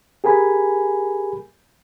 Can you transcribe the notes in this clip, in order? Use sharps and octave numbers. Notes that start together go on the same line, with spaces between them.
G4 G#4 A#4 G#5 B5